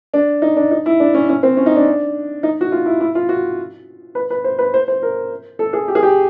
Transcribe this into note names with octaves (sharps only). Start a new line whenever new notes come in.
D4
D#4
D4
D#4
E4
D4
C#4
C#4
C4
C#4
D#4
D4
D#4
F#4
F4
E4
E4
F4
F#4
B4
B4
C5
B4
C5
C5
A#4
A4
G#4
G4
G#4
G4